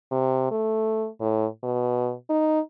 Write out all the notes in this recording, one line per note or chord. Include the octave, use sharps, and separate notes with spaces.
C3
A3
A2
B2
D#4